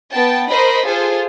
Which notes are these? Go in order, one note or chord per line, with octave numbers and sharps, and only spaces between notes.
B3 G5 A5
A#4 C5 D#5 B5
F4 G#4 A4 C5